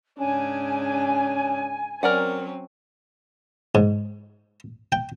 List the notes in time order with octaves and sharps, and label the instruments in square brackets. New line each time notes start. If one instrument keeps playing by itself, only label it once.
[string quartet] G#2 C#3 D4 [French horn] C#4 [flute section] G#5
[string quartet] F#3 C4 C#4 [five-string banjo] A#4 D5 F#5
[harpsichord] G#2
G5